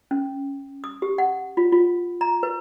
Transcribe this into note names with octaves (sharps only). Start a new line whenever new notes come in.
C#4
D#6
G4
F#5
F4
F4
A#5
B4